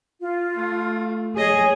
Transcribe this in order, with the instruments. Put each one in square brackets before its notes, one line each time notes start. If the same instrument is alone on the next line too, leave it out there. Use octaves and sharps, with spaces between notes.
[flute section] F4
[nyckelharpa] A3
[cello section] G#4 [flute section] C#5 [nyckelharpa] D#5